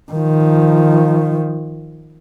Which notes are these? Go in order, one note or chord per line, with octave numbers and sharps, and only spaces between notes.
D#3 F3